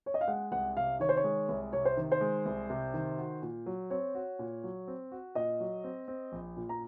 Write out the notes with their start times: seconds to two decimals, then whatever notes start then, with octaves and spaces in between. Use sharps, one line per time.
0.06 C#5
0.14 D#5
0.21 F5
0.28 G#3 F#5
0.52 C2 F#5
0.76 C3 F5
1.00 D#3 C#5
1.09 C5
1.17 C#5
1.24 G#3
1.49 C2
1.73 C3 C#5
1.85 C5
1.97 D#3
2.12 C5
2.21 G#3
2.46 C2
2.70 C3
2.94 D#3
3.18 F#4
3.42 A#2
3.66 F#3
3.90 C4 C#5
4.15 F#4
4.39 A#2
4.64 F#3
4.87 C4
5.12 F#4
5.35 A#2 D#5
5.60 F#3
5.84 C4
6.08 C4
6.32 A#1
6.57 A#2
6.69 A#5